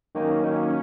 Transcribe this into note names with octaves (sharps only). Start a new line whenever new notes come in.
D#3 F#3 A#3 C#4 D#4
D#3 F#3 A#3 D#4